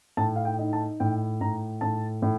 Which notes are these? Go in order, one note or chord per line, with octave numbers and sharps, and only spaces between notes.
A2 A5
F5
G5
D#4
A5
A2 G5
A2 A#5
A2 A5
A2